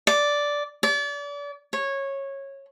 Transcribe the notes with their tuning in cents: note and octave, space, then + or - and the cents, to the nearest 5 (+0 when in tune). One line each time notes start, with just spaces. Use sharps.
D5 -5
D5 -35
C#5 -15